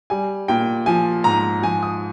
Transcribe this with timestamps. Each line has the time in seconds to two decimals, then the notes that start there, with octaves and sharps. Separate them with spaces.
0.10 G3 G#5
0.48 A#2 G5
0.86 F3 G#5
1.24 G#2 A#5
1.63 F3 G#5
1.83 D#6